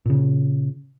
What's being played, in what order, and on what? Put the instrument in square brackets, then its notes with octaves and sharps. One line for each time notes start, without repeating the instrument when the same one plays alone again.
[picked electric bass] A#2 C#3